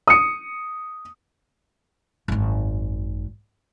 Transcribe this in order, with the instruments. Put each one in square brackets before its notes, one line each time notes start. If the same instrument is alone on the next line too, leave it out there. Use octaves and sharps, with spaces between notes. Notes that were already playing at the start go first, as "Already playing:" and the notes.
[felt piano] D#6 C#7
[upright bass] G#1 F#2